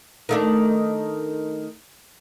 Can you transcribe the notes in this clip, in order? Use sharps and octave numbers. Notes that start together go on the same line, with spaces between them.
D#3 A3 D4